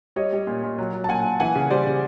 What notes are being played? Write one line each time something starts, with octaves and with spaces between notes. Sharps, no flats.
G3 C#5 D#5
G3
A#2
A#2
F#3
F#3
A5
A#2 F#5 G#5
A#2
E3 F#5 G#5
C#3
G3 C5 D5
C#3